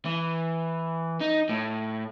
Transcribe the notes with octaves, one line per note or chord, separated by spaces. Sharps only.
E3
D#4
A2